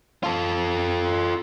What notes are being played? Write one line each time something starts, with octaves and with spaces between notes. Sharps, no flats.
F4 A4